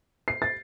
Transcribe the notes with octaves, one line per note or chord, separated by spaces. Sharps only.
C7
A6